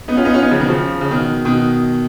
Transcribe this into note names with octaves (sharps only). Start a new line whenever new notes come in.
B3 D#4
C#4 F4
B3 D#4
C#4 F4
B3 D#4
C#3 F3
B2 D#3
C#3 F3
C#3
B2 D#3
B2 D#3